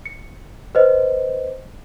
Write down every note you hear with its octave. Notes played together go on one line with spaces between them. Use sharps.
C#7
B4 C5 D#5